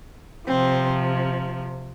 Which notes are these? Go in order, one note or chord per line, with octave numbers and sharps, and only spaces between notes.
C3 F3 C4